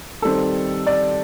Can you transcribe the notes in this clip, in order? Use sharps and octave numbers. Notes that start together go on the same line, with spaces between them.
D#3 G3 C4 A4
D5